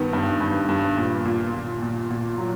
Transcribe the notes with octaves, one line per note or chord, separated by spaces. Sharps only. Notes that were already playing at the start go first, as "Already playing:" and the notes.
Already playing: G2 D#3 B3
G2
G2
G2
A#2
A#2
A#2
A#2
A#2
F#3